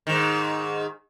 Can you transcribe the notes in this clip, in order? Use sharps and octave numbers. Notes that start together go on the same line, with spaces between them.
G#2 D#3